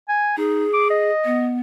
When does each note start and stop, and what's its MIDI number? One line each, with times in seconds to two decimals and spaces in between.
0.09 0.36 80
0.37 0.65 63
0.37 1.11 68
0.73 0.87 86
0.90 1.55 75
1.25 1.60 59